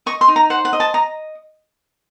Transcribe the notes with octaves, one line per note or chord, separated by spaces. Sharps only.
D#5 C#6
C6
D#4
A#5
C5 F#5
F#5
D#5
A5
D#5 A#5